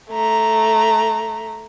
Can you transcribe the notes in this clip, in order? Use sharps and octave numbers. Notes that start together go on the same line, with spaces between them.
A3 A#5